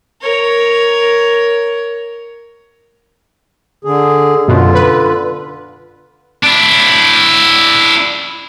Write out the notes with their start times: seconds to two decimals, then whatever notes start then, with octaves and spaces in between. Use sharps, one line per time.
0.21 A#4 C#5
3.85 D3 G#4
4.48 F#2 B2 D3 F4
4.75 B4
6.44 D4 E4